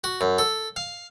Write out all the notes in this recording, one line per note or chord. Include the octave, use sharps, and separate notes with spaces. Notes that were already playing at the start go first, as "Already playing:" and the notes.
F#4
F#2
A4
F5